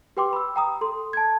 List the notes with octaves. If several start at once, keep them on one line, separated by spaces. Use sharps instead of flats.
G4 B4 G5 C6 D6
B5 E6
G5 A#5 D#6
A4 C6
A5 G#6